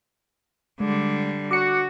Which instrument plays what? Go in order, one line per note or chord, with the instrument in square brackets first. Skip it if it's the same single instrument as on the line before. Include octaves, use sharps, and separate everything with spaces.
[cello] D3 G3 [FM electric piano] G#3
[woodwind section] F#4 [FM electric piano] D6 C#7